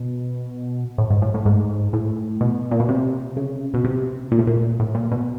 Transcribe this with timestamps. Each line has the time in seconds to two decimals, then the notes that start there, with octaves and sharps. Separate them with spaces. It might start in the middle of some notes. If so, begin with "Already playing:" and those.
Already playing: B2
0.98 A2
1.10 G#2
1.22 A2
1.34 A2
1.46 G#2
1.93 A2
2.41 B2
2.71 A#2
2.80 B2
2.89 C3
3.37 C#3
3.74 B2
3.84 C3
4.32 A#2
4.39 A2
4.47 A#2
4.80 A2
4.95 A#2
5.12 B2